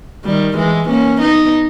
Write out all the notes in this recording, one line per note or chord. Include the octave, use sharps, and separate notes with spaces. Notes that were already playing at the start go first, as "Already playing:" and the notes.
D#3 G3
E3 G#3
A#3 C#4
B3 D#4